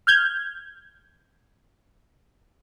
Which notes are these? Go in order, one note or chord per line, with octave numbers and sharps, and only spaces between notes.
F6 G6 G#6